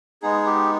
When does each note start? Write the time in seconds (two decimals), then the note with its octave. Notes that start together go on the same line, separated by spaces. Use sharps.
0.22 G#3 B3 D#4 G#4
0.46 G4